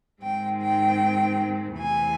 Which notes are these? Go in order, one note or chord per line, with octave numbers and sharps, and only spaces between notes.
G#2 D#3 G#3 C4 G5
G5
E2 C3 E3 A3 C4 G#5